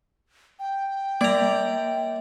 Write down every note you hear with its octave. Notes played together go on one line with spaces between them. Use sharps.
G5
A#3 D5 A#5